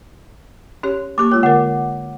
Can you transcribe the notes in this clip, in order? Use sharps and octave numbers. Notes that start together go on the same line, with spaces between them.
C#4 G4 C#5
A#3 G4 C#6 D6
G#3 F4 C#5 G5
D3 A#4 F#5